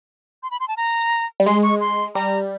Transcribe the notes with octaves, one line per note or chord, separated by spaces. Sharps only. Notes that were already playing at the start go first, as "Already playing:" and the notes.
C6
B5
C6
A5
A#5
G3
G#3 C6
C#6
C6
G3 A#5